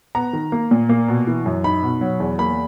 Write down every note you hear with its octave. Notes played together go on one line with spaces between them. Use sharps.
B3 A#5
D#3
A#3
A#2
A#3
B2
E3
F#2
D#4 B5
B2
F#3
E2
A#3 B5